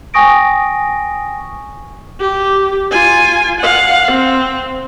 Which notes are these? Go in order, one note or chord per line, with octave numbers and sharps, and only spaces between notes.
G5 G#5 C#6 D#6 A#6 D7
G4
F4 G#5
F5 F#5
C4